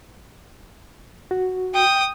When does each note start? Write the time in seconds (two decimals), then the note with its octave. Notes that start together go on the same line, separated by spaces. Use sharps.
1.31 F#4
1.75 G5 D#6